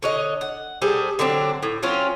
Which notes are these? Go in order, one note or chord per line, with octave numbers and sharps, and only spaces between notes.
D3 C#5 D#5
F#5
G3 G#4 A4 C5
D3 F#3 C4 D4
A2
F#3 C4 C#4 F4